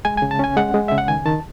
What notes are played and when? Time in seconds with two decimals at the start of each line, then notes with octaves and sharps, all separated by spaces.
0.05 G#3 G#5
0.17 C#3 G#5
0.31 A5
0.39 C#4 G#5
0.57 G#3 F#5
0.74 G#3
0.88 C#3 E5
0.98 F#5
1.08 D#3 G#5
1.26 D#3 A5